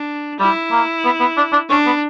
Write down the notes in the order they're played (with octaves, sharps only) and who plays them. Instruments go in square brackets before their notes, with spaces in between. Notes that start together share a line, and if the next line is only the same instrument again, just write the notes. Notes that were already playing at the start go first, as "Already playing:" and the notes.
Already playing: [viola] D4
[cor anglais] G3 [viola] E4
[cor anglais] A#3
B3
B3
D4
D4
[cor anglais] C#4 [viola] D4
[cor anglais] B3